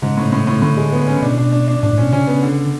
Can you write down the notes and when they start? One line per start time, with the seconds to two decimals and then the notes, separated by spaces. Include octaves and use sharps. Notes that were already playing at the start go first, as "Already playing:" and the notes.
0.02 G#2 C#3
0.17 A2
0.32 A2
0.47 A2
0.62 A2 D3
0.77 G#3
0.92 B3
1.07 C#4
1.22 B2 D4
1.38 D4
1.52 D4
1.68 D4
1.83 A2 D4
1.93 A2
1.98 B2 C#4
2.12 C#3 C#4
2.27 B3
2.43 D3